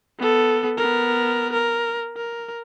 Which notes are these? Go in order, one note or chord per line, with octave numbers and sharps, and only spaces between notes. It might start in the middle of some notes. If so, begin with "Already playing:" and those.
B3 A4
B3 A#4
A#4
A#4